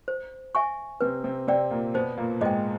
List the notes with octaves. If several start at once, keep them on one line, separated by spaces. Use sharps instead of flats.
C5
E5 G#5 C#6
C3 C4 B4
C3 C4
C3 C4 D5 G5
A#2 A#3
B2 B3 C5
A#2 A#3
G#2 G#3 D#5 G5